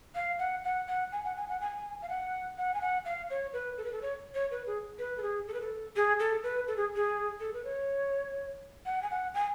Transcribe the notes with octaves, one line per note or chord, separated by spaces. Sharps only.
F5
F#5
F#5
F#5
G#5
F#5
G#5
F#5
G#5
F5
F#5
F#5
G#5
F#5
F5
C#5
B4
A4
B4
A4
C#5
C#5
B4
G#4
B4
A4
G#4
A4
B4
A4
G#4
A4
B4
A4
G#4
G#4
A4
B4
C#5
F#5
G#5
F#5
G#5